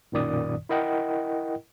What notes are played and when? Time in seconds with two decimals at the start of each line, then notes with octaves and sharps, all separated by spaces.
0.12 B1 F#2 A#2 D#3 D5 D#6
0.69 E4 A#4 D#5 F#5 G5